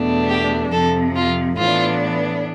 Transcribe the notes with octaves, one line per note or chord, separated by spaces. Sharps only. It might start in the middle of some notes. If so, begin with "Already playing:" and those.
Already playing: E2 B2 A3 D4
G4
F2 C3 F3 A4
F4
A2 E3 B3 D4 F4